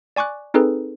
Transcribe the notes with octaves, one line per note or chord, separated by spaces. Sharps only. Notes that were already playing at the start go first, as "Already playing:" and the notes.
D5 G#5 C#6 D6 F#6
C4 D#4 G#4 A4 B4